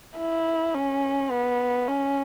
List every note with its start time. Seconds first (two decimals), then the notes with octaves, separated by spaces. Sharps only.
0.18 E4
0.75 C#4
1.31 B3
1.88 C#4